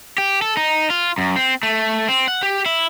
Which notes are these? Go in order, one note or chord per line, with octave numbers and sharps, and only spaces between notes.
G4
A4
D#4
F4
F#2
C4
A3
C4
F#5
G4
E4